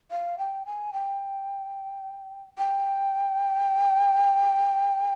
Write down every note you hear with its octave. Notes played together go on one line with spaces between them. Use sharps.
F5
G5
G#5
G5
G5